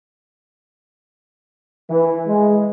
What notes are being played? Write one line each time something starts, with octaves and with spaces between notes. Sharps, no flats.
E3
G#3